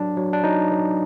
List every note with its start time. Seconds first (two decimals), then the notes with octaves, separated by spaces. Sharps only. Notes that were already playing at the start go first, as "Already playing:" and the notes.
Already playing: F#3 D4
0.17 F#3
0.33 D4
0.44 F#3 D#4
0.71 F#3